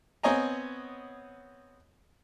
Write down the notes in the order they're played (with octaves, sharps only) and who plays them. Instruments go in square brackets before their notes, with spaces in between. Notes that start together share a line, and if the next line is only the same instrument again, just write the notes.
[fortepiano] B3 C4 C#5 D#5 G#5 A#5